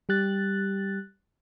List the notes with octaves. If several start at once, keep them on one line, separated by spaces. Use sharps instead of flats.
G3 G4 F#6 A6